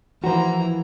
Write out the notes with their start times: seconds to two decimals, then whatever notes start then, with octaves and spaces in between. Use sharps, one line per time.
0.24 E3 F3 A#3 F#4 C5 A#5